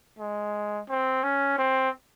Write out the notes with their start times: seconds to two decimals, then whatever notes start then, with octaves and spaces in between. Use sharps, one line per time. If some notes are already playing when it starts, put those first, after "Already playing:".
0.18 G#3
0.89 C4
1.23 C#4
1.58 C4